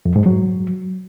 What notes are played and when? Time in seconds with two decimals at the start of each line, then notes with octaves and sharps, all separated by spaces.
0.06 F2
0.16 G#2
0.26 F#3